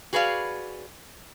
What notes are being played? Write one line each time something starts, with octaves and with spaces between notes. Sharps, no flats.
F#4 G#4 B4 D5 F5